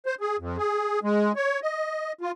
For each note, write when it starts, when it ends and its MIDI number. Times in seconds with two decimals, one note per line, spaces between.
0.06 0.15 72
0.20 0.37 68
0.39 0.57 41
0.57 0.99 68
1.03 1.32 56
1.36 1.60 73
1.62 2.12 75
2.21 2.32 65